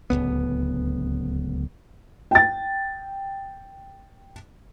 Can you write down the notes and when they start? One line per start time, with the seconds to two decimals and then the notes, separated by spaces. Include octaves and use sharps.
0.10 D1 G1 C#2 B3
2.31 G5 A6